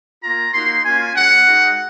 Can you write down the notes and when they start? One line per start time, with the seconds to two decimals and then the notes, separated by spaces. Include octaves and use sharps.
0.23 A#3 F4 A#5
0.54 A#3 D#4 F#4 C6
0.85 A#3 C#4 F4 G#5
1.16 G#3 C#4 F#4 F#5
1.46 G#3 D#4 F#4